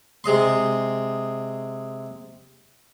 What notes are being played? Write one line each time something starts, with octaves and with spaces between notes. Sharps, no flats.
C3 G#3 D#5 C6